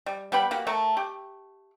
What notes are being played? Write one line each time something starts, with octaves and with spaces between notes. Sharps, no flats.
G3
G3 B3 G5 B5
A#3 F#4 G4
A3 A4 A#4 A5
G4